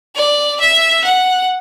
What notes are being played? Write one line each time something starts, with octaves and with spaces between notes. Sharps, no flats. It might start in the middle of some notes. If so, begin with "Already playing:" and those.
D5
E5
F#5